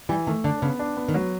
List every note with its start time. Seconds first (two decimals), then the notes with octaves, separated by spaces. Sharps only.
0.09 E3 G3
0.27 D#3 A3
0.44 D3 D4
0.62 C#3 B3
0.79 D4
0.97 B3
1.08 D#3
1.14 F#3